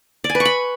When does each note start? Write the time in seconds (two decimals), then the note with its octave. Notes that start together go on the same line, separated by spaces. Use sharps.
0.24 D5
0.30 G#5
0.35 B4
0.40 C#6
0.45 B5